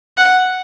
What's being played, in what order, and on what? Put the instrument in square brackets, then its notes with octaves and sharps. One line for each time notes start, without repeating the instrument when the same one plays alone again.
[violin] F#5